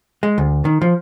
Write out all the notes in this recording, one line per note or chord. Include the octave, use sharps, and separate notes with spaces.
G#3
D2
D#3
F3